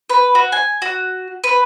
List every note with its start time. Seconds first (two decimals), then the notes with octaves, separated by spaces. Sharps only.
0.10 B4
0.35 F#4
0.52 G#5
0.82 F#4
1.44 B4